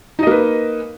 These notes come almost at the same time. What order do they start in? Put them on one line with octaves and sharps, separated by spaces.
D#4 D#5 A#3 B4